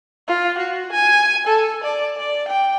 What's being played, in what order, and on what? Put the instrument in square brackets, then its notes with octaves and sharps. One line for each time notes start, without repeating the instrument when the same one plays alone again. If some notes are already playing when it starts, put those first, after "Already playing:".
[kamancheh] F4
F#4
G#5
A4
D5
D5
G5